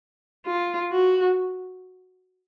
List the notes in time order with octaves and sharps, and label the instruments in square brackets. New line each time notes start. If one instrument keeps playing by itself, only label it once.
[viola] F4
F#4